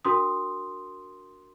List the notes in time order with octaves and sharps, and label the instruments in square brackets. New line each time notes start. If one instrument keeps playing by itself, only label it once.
[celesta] D4 F#4 A#4 C6 D#6